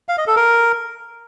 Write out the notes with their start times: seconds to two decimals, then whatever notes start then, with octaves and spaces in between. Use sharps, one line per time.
0.09 F5
0.18 D#5
0.27 A4
0.36 A#4